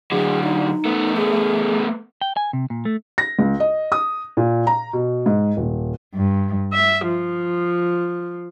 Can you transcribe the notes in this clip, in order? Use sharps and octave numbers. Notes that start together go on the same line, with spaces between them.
D3 F#3 G#4
D#4
A3 B3
G#4
G5
G#5
C3
A#2
A3
A#6
C#2
D#5
D#6
A#2
A#5
B2
G#2
D#1
G2
E5
F3